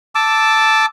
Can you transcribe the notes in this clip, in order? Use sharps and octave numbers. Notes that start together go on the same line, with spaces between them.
A5 D6 E6